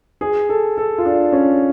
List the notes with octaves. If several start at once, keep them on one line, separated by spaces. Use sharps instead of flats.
G#4
A4
A4
F4
D4
C#4